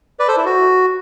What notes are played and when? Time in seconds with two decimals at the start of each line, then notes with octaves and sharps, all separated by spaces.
0.19 B4 D5
0.28 A4 C5
0.37 E4
0.46 F#4